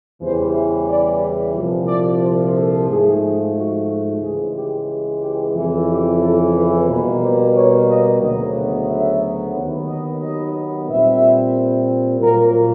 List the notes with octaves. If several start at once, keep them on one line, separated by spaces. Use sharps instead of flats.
E2 C#3 E3 G3 C5
D5
C2 A#2 F3
D5
C5
A4
G#2 F3 A3 G#4
F#4
C#2 C#3 E3 G#3 G#4
G4
G4
F2 C#3 E3
G4
A4
B4
B2 G3 A#3 B4
C5
C#5
D#5
D2 C#3 F#3 B3 D#5
E5
D#2 D#3 F#3 B3
D#5
D#5
A#2 G3 C4 E5
A#2 F#3 A#3 A#4